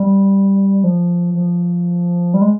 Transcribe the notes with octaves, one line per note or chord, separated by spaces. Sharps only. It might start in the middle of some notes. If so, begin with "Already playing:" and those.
Already playing: G3
F3
F3
G3
G#3